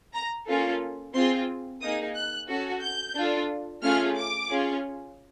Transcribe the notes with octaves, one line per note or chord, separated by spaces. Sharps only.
A#5
A#3 C#4 F4 A4
C4 F4 G#4 C6
A#3 D#4 G#4 D#6
F#6
C#4 F#4 A4
G6
D4 F4 A4
A3 C#4 F4 G#4 F6
D6
C#4 F4 G#4